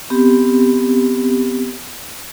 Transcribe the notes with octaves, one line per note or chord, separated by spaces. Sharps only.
B3 C4 G4